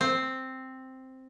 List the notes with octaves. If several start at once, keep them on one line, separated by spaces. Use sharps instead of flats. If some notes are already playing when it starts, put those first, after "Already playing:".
C4